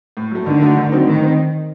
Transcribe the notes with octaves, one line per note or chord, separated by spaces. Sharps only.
A2
F#3 A3
D3 D#3
A3 D#4 F#4
D#3
F#3 C4 D#4
A2 D#3
C4